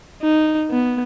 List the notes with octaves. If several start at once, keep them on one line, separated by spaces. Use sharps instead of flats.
D#4
B3